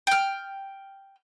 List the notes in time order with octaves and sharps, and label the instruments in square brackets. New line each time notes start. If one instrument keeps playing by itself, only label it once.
[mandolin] G5 F6